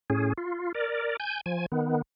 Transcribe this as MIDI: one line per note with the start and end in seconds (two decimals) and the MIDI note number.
0.10 0.33 45
0.10 0.33 61
0.10 0.33 68
0.38 0.72 65
0.74 1.17 70
0.74 1.17 74
1.20 1.41 80
1.20 1.41 91
1.46 1.66 53
1.46 1.66 80
1.72 2.02 51
1.72 2.02 59